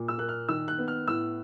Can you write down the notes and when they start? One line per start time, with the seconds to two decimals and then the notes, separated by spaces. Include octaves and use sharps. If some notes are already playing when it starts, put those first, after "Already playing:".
Already playing: A#2
0.08 E6
0.18 A#3 F#6
0.29 F6
0.49 D#3 E6
0.68 F#6
0.78 B3
0.88 F6
1.08 A2 E6